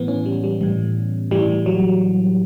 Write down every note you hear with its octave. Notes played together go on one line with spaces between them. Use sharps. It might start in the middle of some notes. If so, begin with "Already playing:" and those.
Already playing: A2 E3 B3
C#4
G3
G3
A2 E3 G3
A2 E3 G3
F#3